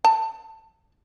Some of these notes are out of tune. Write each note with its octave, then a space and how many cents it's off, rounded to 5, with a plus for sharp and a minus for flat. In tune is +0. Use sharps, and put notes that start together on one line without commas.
A5 +10